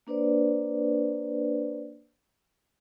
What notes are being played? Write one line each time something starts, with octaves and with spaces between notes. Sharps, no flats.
A#3 D4 B4 C5 D5